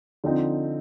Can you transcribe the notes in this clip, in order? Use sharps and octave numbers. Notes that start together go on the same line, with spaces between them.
D3 F3 C4 D#4